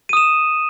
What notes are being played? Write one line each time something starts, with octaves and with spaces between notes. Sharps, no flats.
D#6 D#7 E7